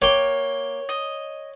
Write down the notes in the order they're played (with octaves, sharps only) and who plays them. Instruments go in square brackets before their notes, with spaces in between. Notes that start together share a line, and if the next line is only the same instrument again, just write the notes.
[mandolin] A#3 [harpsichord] C#5 G5
[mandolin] D#5